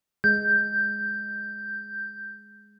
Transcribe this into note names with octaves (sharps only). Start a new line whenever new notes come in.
G#3 G6